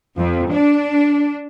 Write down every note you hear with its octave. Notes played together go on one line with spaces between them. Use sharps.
F2
D4